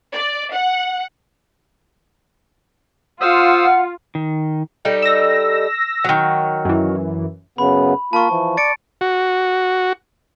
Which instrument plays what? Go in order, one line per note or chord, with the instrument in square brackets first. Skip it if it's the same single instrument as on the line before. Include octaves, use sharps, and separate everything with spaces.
[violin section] D5
F#5
[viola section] F4 [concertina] C5 D#6 E6 [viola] F5 [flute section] F#5
[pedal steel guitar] D#3
[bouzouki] G3 D#4 A4
[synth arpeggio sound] E6 A#6
[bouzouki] D#3 F#3
[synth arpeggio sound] F#2 E3
[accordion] F#2 C#3 B3 [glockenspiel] B5
[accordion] A#3 F4 B5 [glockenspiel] A5 C#6
[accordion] E3 F3
[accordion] D5 [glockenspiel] A6 C#7 D7
[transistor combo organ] F#4